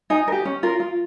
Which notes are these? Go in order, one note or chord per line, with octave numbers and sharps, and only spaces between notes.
D#4 G#5
A#4
G4
C#4
F4 A#4
F4